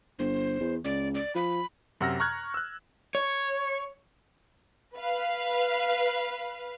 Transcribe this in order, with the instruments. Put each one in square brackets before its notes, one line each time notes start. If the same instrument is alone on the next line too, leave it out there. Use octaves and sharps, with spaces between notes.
[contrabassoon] G1 [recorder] C5
[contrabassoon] E2
[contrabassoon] C#2 [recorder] D5
[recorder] D5
[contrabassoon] F3 [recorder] B5
[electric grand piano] F#2 C3 F#5 E6 F6 A#6
A#5 C#6 F6 F#6 G#6
E6 F#6
[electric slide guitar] C#5
[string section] B4 F5